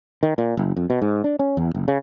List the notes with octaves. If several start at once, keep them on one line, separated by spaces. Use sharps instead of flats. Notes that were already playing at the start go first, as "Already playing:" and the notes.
D#3
A#2
F#1
F2
B2
G#2
D4
C#4
E2
F#1
C#3